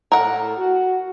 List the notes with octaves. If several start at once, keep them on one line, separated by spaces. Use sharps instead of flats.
A2 A4 A#4 F#5
F#4